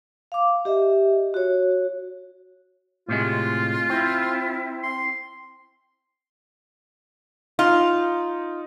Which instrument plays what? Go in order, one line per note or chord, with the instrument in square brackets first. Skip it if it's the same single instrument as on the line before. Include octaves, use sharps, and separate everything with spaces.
[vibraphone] F5 D6
G4 D#5 E5
F#4 C#5
[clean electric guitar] A2 C3 G#3 [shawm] F4
[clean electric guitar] C4 [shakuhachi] E4
[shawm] C6
[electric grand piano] D#4 [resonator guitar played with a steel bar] F4